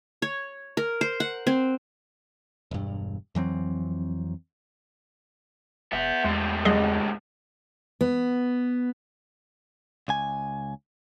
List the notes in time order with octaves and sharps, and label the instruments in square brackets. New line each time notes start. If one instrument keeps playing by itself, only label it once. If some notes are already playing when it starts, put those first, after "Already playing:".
[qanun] C#5
A#4
C5
F#5
C4
[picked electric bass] E1 G2
F2 E3 F#3 C4
[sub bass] E1 [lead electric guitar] B3 E5
[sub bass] E2 [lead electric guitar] A2 G3 [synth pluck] G#3
[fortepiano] G#1 C#2 F#5 [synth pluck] G#4 D#5
[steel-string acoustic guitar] B3
[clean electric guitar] C#2 G#5